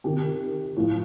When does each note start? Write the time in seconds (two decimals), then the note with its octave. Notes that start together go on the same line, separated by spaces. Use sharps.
0.04 C3 D#3 G4
0.76 A2 F3